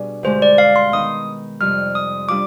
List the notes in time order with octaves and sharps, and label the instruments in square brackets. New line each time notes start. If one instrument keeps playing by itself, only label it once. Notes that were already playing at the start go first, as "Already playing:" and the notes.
Already playing: [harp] B2 G3 D4 G#4
[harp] D2 D3 G#3 D4 G4 [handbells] C5
[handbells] D5
F5
C6
[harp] D#3 B3 D#4 [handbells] D#6
[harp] F2 C3 G3 [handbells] F6
[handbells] D#6
[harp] G3 D4 F4 [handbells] D6